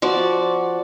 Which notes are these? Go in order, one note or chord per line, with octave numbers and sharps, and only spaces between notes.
F3 F#4 D5